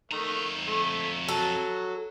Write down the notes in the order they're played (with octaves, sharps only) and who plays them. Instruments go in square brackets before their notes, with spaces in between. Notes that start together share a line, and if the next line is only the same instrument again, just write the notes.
[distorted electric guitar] F2 A#5 [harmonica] D#3 A3
[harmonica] A3
[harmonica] F#3 [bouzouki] A4